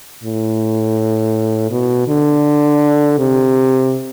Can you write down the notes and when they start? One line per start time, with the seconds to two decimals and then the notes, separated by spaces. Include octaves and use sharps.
0.24 A2
1.71 B2
2.08 D3
3.19 C3